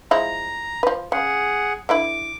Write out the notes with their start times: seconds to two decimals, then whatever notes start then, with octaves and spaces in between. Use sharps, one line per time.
0.11 F3 G#3 E4 A#5
0.83 F3 B4
1.12 C#3 G#4 F#5
1.89 D3 E3 E4 D6